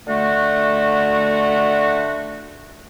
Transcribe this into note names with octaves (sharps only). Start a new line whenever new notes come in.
D3 A3 F#4